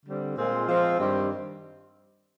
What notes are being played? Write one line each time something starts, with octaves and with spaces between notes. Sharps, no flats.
D3 G3 C4
A#2 G#3 C4 F4 G#4
F3 G#3 C4
G2 D#3 G3 C4 G4